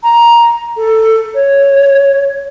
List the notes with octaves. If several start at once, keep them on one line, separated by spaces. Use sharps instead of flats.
A#5
A4
C#5